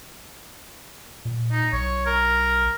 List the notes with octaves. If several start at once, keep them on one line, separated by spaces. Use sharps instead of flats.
A#2
D#4
B1 C#5
A#4